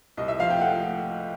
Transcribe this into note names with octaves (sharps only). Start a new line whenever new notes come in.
C2 D#5
E5
F3 F5
G5
A3 F#5